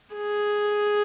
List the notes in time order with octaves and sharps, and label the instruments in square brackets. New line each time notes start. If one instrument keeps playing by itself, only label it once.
[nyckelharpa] G#4